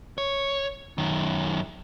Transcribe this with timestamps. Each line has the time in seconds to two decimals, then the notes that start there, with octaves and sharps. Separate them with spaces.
0.18 C#5
0.98 F#2 D#3